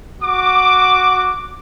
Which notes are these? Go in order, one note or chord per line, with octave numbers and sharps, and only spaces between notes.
F#4 D6